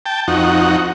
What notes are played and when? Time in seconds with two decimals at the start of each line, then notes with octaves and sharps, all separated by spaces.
0.06 G5 A5
0.28 F2 D#4 F#4